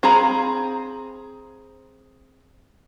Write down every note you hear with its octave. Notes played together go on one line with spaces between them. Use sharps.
C4 G#4 F5 A#5 B5